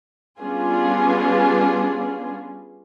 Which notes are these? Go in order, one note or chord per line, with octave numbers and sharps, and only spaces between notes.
G3 B3 C#4 D4 F4 G#4